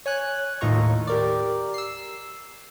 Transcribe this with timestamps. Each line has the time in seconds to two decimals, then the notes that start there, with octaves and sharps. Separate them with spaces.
0.06 C#5 G#5 F#6
0.61 D#2 A2 D#4 F4 A#5 C#6
1.07 G4 A#4 D5
1.74 E6 C7